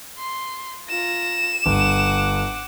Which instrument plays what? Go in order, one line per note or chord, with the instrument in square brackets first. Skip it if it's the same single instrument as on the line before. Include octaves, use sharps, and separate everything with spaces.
[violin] C6
[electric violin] F4 A#5 [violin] E7
[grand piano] G1 [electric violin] F#5 D6